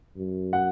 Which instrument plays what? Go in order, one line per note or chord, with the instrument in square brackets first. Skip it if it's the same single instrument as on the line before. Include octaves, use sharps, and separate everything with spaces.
[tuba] F#2
[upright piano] F#5